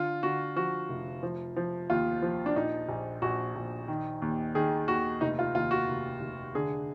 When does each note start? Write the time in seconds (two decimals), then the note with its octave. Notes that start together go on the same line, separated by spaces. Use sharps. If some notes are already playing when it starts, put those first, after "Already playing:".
Already playing: D3 F4
0.23 D3 F#4
0.56 F3 F#4
0.89 F1
1.23 F3
1.56 F3
1.90 D#2 F4
2.22 F3
2.46 D4
2.56 A#1 D#4
2.89 A#1
3.22 A#1 F#4
3.56 A#1
3.88 D#3
4.22 D#2
4.55 D#3 G#4
4.88 D#2 F#4
5.21 F1 D#4
5.39 F4
5.55 D#2 F4
5.71 F#4
5.89 F1
6.21 F1
6.55 D3 G#4